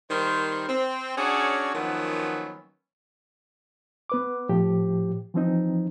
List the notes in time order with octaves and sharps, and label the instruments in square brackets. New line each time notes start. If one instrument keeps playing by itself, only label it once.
[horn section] D#3 G3 A#4 C5
C4
C#4 D4 F#4 G#4 C#5 D5
D#3 F3 F#3 A#3 B3 C#4
[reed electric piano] B3 B4 D6
A2 F3 G4
E3 F3 C4 D#4